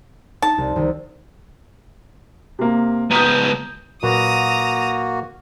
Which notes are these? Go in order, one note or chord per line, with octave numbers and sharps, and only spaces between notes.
D#4 A5
C2
C2 C3 D#3
C3 A#3
C#2 B3 A#5 D#6 G6
A#2 F#3 A#3 F#4 B4 A#5 D#6